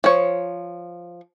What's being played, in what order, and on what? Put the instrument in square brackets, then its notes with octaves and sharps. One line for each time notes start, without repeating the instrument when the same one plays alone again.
[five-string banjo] F3 C#5